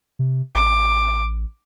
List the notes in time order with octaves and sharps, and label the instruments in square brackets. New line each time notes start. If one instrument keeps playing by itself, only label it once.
[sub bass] C3
[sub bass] A1 [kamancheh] D6